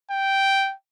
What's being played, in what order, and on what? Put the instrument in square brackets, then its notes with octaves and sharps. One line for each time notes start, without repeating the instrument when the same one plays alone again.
[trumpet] G5